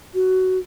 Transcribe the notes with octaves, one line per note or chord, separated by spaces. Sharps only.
F#4